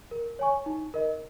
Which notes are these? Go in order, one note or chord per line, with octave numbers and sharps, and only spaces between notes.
A#4
C#5 G#5 C#6
D#4
A#4 D#5